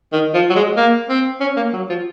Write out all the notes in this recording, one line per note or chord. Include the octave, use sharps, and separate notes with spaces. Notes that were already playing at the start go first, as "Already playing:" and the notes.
D#3
F3
F#3
G#3
A#3
C4
C#4
A#3
F#3
F3